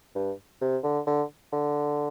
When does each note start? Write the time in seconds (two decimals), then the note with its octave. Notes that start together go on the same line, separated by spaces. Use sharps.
0.15 G2
0.61 C3
0.84 D3
1.07 D3
1.52 D3